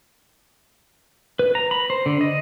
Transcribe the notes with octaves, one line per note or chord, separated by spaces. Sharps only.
B4
A#5
B5
C5
D3
D#5